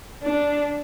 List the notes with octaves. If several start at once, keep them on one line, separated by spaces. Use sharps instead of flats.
D4